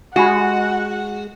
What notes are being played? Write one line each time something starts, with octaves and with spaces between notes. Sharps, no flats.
G#3 F#4 G4 F#5 G#5 B5